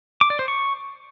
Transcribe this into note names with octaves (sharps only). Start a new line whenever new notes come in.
D6
D5
C5
C#6